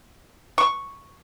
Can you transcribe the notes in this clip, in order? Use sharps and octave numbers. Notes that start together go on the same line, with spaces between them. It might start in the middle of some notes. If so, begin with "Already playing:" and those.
C#6